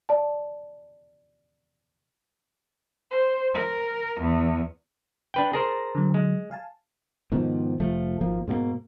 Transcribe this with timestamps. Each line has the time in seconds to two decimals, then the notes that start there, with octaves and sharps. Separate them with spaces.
0.09 D5 A5
3.11 C5
3.54 A#4
4.21 E2
5.34 D4 B4 G5
5.53 G#4 A#4 C5 A5 A#6
5.95 D3 F#3
6.14 G#3
6.51 F5 G#5 A5
7.32 G#2 B2 D#3 F3
7.80 F1 F3 A3
8.21 G#1 F3 A#3
8.48 G#2 B2 A3 A#3